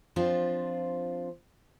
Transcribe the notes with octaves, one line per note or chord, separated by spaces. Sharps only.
F3 C4 D4 F4